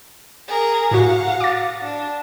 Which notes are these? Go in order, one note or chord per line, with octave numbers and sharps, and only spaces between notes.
G#4 A#4
A2 F#4 F5 F#5
D6 A6
D4